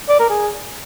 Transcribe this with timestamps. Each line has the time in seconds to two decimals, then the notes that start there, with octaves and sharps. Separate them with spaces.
0.09 D5
0.19 A#4
0.30 G#4